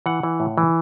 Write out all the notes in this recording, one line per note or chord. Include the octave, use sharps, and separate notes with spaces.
E3 F#5
E3
A2
E3